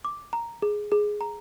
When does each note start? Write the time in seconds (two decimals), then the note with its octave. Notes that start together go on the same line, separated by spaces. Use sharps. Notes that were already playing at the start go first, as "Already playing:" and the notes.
0.05 D6
0.33 A#5
0.62 G#4
0.92 G#4
1.21 A#5